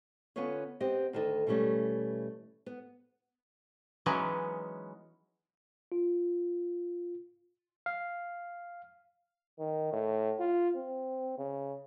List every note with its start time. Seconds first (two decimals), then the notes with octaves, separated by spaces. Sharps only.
0.36 D3 B3 C#4 F4 B4 C#5
0.80 B3 C4 G4 D#5
1.13 D2 D#3 D4 A4 D#5
1.47 B2 E3 G3 A3 C#4
2.66 B3
4.06 E3 F#3 G#3 B3 C#4 D#4
5.92 F4
7.86 F5
9.59 D#3
9.93 A2
10.40 F4
10.76 C4
11.38 C#3